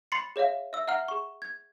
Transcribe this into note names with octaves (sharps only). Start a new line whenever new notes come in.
B5 C6 A6 C7 C#7
G#4 C#5 E5 F5
E5 E6
E5 F#5 A#5 F6
G#4 C#6
G#6